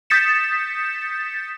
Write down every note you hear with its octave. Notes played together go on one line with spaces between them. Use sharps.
D#6 G6 A6 B6 C#7 E7